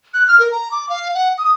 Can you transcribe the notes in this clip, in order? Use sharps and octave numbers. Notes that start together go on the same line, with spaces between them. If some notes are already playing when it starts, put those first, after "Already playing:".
F#6
F6
A#4
A#5
D6
F5
F#5
D#6